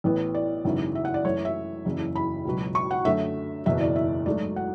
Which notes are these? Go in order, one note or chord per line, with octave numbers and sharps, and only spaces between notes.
A1 A2 E3 B3
D5
G#1 F#2 C#3 E3 B3
E5
F#5
D5
F#2 E3 A3 C#5
E5
F#1 E2 C#3
B5
C#2 B2 F#3
C#6
F#5
F#2 D3 A3 E5
F#1 E2 B2 E5
D5
E5
G#2 F#3 A3 D5
F#5